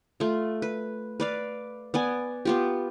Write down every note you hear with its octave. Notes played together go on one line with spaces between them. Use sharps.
A3 F4
B4
B4 D5 F5
B3 D5 G#5
B3 F4 G4